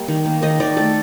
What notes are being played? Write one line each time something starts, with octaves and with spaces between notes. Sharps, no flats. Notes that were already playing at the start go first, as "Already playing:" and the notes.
Already playing: G3 A#3
D#3
A#3
D#3 D#5
D#3 D5
A3 A4